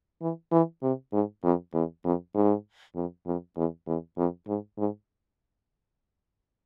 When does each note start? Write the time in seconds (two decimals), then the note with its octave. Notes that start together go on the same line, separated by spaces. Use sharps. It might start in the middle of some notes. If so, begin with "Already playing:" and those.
0.22 E3
0.52 E3
0.83 C3
1.13 G#2
1.44 F2
1.74 E2
2.05 F2
2.35 G#2
2.96 F2
3.26 F2
3.57 E2
3.87 E2
4.17 F2
4.48 G#2
4.79 G#2